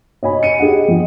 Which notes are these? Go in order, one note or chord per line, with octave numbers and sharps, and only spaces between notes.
C#5 D#5 G#5 B5
C#7 D#7
G4 G#4 D#5 F#5
F3 D#5